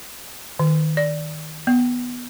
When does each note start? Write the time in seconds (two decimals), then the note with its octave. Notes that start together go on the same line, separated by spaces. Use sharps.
0.59 D#3
0.97 D5
1.67 B3